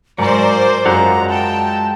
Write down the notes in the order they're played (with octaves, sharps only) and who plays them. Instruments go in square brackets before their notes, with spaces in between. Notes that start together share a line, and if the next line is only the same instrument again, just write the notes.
[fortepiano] G#2 A#5 [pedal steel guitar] F#3 [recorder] A#4 [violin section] C5 D5
[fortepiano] F#2 [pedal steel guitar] G#3 F4 F#5 [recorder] A#5
[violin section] G5 [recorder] A5